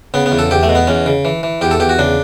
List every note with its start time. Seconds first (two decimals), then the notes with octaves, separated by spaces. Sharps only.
0.14 C#3 B3
0.26 B3
0.32 E2
0.39 A4
0.51 E2 G4
0.63 A3
0.69 B2
0.75 B3
0.87 E2 C#4
1.06 C#3
1.25 E3
1.43 E3
1.61 E2 G4
1.71 A4
1.80 E2 G4
1.89 F#4
1.99 C#3 D4